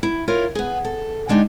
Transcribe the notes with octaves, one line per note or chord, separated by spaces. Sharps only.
E4
E4 F4 A#4 C#5
B3 G#4
A4
D3 G#3 D4 D#4 G4